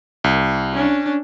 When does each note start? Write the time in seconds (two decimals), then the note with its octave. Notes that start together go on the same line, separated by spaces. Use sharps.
0.24 C2
0.73 C#4 D4